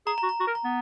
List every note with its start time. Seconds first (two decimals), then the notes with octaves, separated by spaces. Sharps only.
0.07 G#4 A#5
0.18 A#5
0.23 F#4
0.29 A#5
0.40 F#4
0.47 A#4
0.55 A#5
0.64 B3